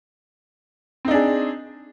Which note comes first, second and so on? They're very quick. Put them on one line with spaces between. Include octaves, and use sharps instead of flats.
C4 D#4 D4 G#4